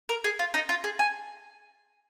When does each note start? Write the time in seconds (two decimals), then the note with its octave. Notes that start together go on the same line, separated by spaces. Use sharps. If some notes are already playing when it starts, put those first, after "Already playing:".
0.09 A#4
0.24 G#4
0.39 F4
0.54 D#4
0.69 F4
0.84 G#4
0.99 G#5